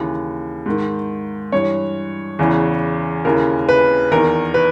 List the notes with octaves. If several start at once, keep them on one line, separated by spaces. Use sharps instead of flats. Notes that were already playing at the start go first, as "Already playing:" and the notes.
Already playing: D#2 C#3 E3
G#2 D#3
G2 E3 C#5
E2 C#3 E3
D#2 C#3 E3 A#4
B4
E2 D#3 A#4
B4